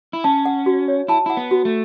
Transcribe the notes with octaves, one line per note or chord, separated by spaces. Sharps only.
E4
C#4 A5
F#5
F#4
C#5
E4 A5
E4 F#5
B3
F#4
A3